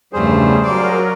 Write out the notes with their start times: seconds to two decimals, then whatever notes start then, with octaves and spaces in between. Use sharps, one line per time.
0.13 E2 G2 C#3 F3 G3 A3 G#4 C5
0.66 F#3 F4 A#4 D5